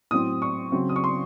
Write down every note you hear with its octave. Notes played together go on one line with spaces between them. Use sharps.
A2 F#3 C4 D#6
C#6
C#3 F#3 C4
D#6
C#6
C6